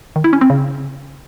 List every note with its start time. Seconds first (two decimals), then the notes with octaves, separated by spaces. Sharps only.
0.16 D#3
0.24 E4
0.33 C#4
0.41 C4
0.50 C#3